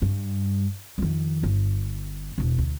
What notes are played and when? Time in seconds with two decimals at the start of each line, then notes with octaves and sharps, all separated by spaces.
0.02 G2
0.98 F2 D#3
1.43 G1
2.38 E1 D4
2.58 D2